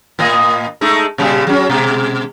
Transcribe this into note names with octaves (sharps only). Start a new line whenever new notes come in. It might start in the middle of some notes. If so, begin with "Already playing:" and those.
A2 A#3 D#5
G#3 A3 D#4
A#2 C#3 G3
F#3 C#4
B2 G#3